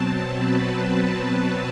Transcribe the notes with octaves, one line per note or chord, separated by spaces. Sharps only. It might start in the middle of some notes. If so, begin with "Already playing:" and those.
Already playing: B2 F#3 C4 A5
B4